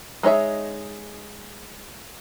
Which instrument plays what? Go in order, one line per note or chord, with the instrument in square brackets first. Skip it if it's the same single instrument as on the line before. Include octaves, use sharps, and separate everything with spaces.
[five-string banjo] G#3 D#4 C#5 E5